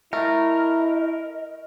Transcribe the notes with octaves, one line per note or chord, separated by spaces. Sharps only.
A3 E4 A#4 D#5